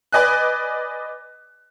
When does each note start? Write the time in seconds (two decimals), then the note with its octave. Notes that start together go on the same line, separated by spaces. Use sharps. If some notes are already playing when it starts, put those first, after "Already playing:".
0.12 B4 D5 D#5 G#5 F#6